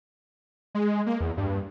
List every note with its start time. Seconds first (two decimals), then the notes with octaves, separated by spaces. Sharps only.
0.75 G#3
1.06 A#3
1.21 E2
1.37 G2